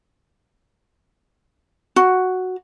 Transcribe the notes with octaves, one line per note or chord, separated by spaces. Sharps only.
F#4